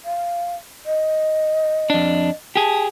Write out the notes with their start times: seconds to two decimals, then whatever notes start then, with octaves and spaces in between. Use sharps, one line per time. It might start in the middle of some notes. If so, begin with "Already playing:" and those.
0.05 F5
0.86 D#5
1.90 F2 D4
2.56 G4 G#4 A5